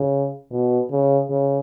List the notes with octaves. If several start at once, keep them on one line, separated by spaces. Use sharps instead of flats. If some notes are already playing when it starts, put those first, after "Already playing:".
Already playing: C#3
B2
C#3
C#3